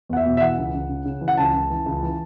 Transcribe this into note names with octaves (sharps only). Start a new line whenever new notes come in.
E2 F#5
E5
B2
E5
E3 F#5
C#2
C#2
C#3
C#3
E3
F#5
C#2 A5
C#2
E3
C#2
E3